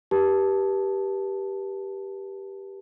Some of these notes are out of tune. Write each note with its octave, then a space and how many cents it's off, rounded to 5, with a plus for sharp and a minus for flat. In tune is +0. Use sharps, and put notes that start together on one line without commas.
G4 +0 B4 -40 A5 +0